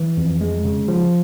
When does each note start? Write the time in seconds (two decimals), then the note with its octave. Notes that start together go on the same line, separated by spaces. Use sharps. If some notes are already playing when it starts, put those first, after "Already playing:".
Already playing: E3
0.17 F2
0.41 G#3
0.64 C#3
0.88 F3